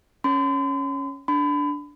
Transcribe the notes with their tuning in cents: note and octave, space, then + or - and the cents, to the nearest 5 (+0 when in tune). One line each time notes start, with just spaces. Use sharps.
C#4 +0 C6 -45
D4 -10 B5 +35